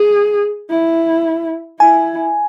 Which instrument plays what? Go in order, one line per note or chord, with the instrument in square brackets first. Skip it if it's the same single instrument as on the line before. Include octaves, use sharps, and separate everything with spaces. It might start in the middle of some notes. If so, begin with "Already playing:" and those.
Already playing: [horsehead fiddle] G#4
E4
[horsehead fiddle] E4 [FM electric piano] G#5